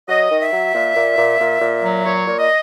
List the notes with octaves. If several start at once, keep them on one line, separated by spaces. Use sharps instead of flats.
F#3 D#5
D#3
E5
F#3
A#2
A#2
A#2
A#2
A#2
F#3
A#2 C#5
A#2
D#5